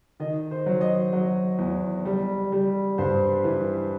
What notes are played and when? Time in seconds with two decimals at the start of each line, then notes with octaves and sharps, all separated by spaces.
0.20 D#3 D#5
0.51 C5
0.66 F#3
0.81 D#5
1.13 F#3
1.59 E2
2.05 G3
2.52 G3
2.98 G2 C5
3.44 E3